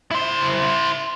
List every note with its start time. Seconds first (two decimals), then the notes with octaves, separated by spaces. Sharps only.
0.11 E4 C5